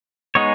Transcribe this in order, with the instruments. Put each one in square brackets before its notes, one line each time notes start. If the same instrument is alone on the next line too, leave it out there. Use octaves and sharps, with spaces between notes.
[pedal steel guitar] G#3 B3 D#4 G#4 C#5